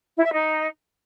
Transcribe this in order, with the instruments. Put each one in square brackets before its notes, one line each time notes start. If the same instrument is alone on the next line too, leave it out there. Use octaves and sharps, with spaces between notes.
[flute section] E4
E5
D#4